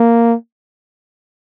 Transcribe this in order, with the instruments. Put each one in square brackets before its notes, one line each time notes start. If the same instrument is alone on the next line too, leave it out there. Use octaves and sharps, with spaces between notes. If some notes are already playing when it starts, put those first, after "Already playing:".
Already playing: [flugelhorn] A#3